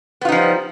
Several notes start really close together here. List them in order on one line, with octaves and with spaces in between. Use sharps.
B3 F4 D#4 F3 G3